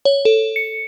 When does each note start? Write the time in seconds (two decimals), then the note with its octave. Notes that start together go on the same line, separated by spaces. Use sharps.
0.05 C#5
0.25 A4
0.56 C#7